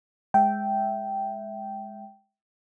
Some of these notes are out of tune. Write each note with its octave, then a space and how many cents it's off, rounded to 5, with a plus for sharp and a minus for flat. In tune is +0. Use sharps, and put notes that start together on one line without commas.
G#3 +0 E5 +0 G5 -10